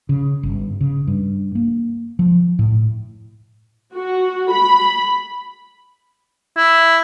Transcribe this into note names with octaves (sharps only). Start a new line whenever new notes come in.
C#3
G1
C#3
G2
A#3
F3
A2
F#4
B5
E4